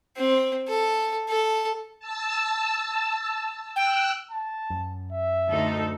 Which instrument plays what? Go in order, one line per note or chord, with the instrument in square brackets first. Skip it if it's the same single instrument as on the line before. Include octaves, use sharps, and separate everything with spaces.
[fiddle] C4
A4
A4
[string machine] A5 E6
[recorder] G5 [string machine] E6 F#6
[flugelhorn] A5
[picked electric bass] F#2
[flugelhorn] E5
[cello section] D2 D#4 A4